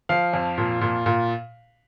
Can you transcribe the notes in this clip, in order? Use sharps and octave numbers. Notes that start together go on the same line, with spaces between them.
F3 F5
F2
A#2
A#2
A#2